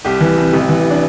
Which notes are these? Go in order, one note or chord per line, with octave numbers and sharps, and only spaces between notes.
C2 G4
E3
C3
A1
E3
D4